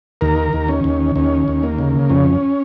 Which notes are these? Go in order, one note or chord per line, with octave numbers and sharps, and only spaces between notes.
D#2 A#4
D#2
C#4
D#2
D#2 C#4
D#2
A#3
C#3
F2 C#4